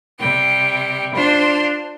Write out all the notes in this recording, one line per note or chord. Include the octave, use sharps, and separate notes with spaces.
C3 G3 G5
D4 F4 C5